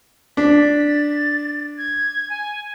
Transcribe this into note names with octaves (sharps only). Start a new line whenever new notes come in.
D4 B6
A6
G#6
G#5